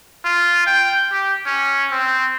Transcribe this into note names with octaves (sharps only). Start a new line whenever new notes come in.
F4
G5
G4
C#4
C4